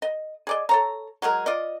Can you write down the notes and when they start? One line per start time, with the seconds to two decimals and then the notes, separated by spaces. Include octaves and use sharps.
0.02 D#5
0.47 G#4 D5 D#5
0.69 A4 C#5 A#5
1.22 F#3 G#3 G#4 A#4
1.46 F4 D5 D#5